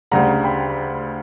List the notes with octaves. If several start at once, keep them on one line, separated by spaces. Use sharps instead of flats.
D2 C#3 G3 F#5 A#5
G5 B5